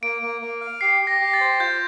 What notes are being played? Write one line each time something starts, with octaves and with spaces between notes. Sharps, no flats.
A#3 D7
A#3
A#3
F5
G4 C7
G4
A#6
G4
A6
C5
F4 G6